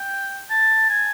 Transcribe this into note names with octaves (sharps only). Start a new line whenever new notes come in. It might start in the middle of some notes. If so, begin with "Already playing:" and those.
Already playing: G5
A5
G#5